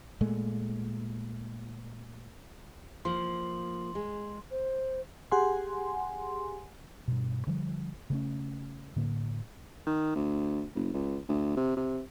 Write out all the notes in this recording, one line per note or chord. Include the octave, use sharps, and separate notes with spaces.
A#2 G#3 A3
F3 A#3 C6 F#7
G#3
C5
G4 G#4 F#5 G#5 C6
G2 B2
D3 F3 G3
C#3 A3 C#4
A2 D3 A#3
D#3
D2
F#1
C#2
D2
C3
C3